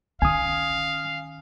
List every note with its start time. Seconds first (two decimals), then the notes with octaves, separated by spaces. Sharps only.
0.22 D#3 C#4 F5 G#5 D#6